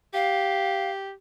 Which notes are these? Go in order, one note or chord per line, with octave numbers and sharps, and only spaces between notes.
G4 F5